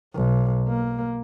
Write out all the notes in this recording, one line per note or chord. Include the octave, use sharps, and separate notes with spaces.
B1
A#3